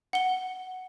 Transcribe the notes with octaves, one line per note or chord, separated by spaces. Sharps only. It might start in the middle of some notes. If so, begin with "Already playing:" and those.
F#5 G7